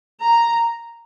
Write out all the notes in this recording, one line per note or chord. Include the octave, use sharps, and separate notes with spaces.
A#5